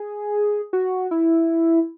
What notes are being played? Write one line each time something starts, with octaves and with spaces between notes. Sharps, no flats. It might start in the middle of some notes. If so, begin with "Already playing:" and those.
Already playing: G#4
F#4
E4